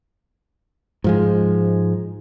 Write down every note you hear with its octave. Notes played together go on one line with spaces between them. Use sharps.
G#2 F3 G#3